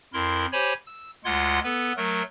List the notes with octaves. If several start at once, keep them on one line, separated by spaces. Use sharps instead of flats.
F2 E4 A#4 C6
G4 C5 C#5 G#5 B5
E6
D2 G#3 F4 F#5 C6 G#6
B3 A4 B4
F#3 A3 A#4